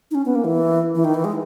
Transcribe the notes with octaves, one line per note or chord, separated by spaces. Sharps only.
D#4
C#4
B3
A#3
E3
E3
D#3
E3
G#3